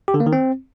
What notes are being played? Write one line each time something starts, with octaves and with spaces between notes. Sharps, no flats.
G4
D3
A#3
D#3
C4